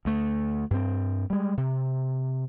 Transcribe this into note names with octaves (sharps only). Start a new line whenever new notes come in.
D2 A3
G2 C4
G3 G#3
C3